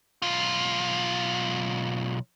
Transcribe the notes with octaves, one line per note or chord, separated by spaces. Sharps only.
B1 F4